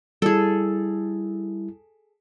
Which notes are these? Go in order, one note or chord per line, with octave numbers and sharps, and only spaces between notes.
G3 E4 G#4 A4